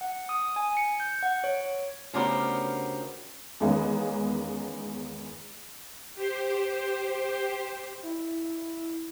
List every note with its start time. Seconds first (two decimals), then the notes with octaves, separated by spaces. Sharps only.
0.01 F#5
0.29 D#6
0.56 G#5
0.77 C#7
1.00 G6
1.23 F#5
1.44 C#5
2.14 D2 C#3 B3 G4 A#4 C5
3.60 E2 D#3 G#3 A#3 B3 C#4
6.16 G4 C5
8.03 E4